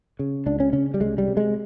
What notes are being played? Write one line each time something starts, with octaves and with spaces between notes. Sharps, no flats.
C#3
C#2 D4
C#4
C#3 C#4
G3
C2 G#3
G3
C3
G#3